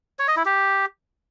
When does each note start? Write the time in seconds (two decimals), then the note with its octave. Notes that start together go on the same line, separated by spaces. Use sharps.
0.19 C#5
0.28 D#5
0.37 E4
0.45 G4